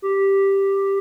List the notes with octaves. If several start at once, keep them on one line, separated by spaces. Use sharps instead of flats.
G4